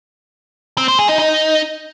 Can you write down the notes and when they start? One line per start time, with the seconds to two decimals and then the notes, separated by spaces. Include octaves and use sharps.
0.78 C4
0.88 C5
0.99 G#4
1.09 D#4
1.19 D#4